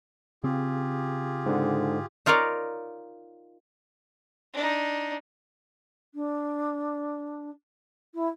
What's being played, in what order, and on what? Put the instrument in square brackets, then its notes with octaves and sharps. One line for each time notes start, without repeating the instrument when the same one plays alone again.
[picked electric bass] C#3 C4 [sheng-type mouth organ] F4 G4 G#4
[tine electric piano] G#2 D3
[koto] D#4 F4 A#4 C#5 D5
[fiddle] D4 D#4
[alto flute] D4
E4